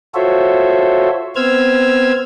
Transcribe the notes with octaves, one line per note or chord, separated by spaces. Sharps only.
F4 F#4 A4 C5 C#5 E5
B3 C4 C5 E6 F6 G#6